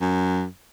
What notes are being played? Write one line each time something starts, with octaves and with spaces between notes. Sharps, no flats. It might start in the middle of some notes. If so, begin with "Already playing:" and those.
F#2